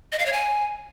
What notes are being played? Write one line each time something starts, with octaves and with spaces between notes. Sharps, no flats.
D#5
F5
C#5
G#5